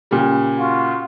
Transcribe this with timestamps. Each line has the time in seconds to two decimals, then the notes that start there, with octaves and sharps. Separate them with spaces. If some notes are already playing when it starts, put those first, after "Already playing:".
0.11 A#2 C#3 G3
0.59 F4 F#4